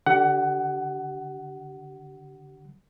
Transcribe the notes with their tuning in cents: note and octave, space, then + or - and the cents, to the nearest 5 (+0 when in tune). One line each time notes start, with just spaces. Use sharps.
D3 +0 G4 -30 F#5 +20